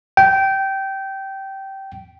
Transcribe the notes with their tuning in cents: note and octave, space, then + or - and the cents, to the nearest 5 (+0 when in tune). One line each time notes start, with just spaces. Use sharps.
G5 -15